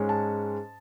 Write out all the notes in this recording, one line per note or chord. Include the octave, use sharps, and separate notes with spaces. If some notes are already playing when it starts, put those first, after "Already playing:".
Already playing: G#2 G#3 C#4
A5